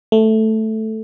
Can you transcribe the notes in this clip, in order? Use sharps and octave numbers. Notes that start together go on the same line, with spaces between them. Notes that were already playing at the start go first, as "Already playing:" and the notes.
A3